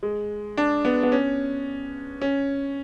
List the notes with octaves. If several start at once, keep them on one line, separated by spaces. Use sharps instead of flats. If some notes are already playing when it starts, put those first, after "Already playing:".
G#3
D4
B3
B3
C#4
C#4